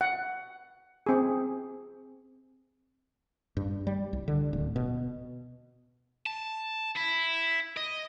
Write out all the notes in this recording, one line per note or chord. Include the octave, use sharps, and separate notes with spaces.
F#5
C4 G#4
G2
G3
C2
D3
D1
B2
A5
E4
D#5